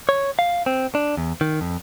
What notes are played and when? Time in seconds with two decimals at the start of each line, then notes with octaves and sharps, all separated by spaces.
0.09 C#5
0.39 F5
0.66 C4
0.95 D4
1.17 E2
1.41 D#3
1.61 F2